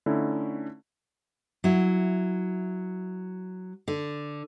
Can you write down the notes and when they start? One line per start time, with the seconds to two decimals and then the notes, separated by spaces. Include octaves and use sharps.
0.06 D3 A3 C#4 D#4 E4
1.64 F#3 E4
3.88 D3